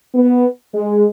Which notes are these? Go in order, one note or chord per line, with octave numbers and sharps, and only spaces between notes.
B3
G#3